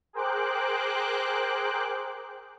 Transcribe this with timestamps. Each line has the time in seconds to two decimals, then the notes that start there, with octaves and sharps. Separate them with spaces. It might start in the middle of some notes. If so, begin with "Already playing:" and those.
0.13 G#4 A#4 C5 G5 D6 F#6